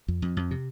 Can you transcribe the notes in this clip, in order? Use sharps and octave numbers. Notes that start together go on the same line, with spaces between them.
F2
F2
F2
C3